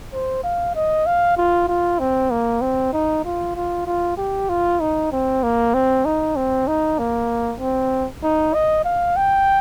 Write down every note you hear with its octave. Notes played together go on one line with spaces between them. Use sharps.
C5
F5
D#5
F5
F4
F4
C4
A#3
C4
D#4
F4
F4
F4
G4
F4
D#4
C4
A#3
C4
D#4
C4
D#4
A#3
C4
D#4
D#5
F5
G5